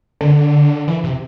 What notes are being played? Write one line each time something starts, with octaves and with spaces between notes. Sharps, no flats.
D3
E3
C3